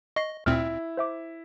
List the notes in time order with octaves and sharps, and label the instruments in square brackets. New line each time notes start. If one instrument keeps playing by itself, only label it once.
[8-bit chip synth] D#5 [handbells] C#6 C7
[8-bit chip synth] D2 A#2 C4 [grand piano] E4 [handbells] F6
[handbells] C5 E5 D6